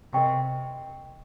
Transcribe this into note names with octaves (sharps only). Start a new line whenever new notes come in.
C3 A#4 D#5 G5 C#6